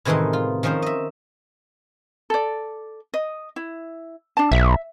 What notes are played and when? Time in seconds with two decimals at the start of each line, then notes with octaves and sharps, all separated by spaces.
0.05 A2 C3 D#3 E3 G#3 D#4
0.33 F4
0.63 D#3 F3 C#4 A#4 C5
0.82 D#5 E5
2.30 A4 D5
3.14 D#5
3.56 E4
4.37 D4 A5
4.52 B1 E5